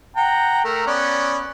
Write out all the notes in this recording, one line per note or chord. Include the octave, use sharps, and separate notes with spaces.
F#5 G5 A#5
A3 A#4
B3 C#4 D5